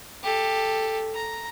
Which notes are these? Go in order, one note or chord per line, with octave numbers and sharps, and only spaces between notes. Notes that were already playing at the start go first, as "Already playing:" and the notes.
G4 A4
A#5